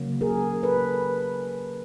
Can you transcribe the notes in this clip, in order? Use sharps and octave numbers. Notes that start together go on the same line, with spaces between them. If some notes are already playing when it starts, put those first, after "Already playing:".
Already playing: C#3 F#3 A#3
G#4 A#4
A4 B4